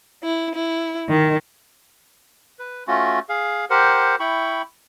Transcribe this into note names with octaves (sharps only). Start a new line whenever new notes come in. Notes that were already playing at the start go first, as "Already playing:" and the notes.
E4
E4
D#3
B4
A3 C#4 F4 F#4
G#4 F5
G4 A#4 C5 F#5
E4 G5 B5 C#6